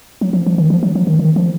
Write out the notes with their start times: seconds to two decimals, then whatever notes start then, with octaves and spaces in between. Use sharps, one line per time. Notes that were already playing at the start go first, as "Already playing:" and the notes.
0.21 F#3
0.33 F3
0.46 F3
0.58 D#3
0.70 F3
0.83 F#3
0.95 F3
1.07 D#3
1.19 D#3
1.36 F3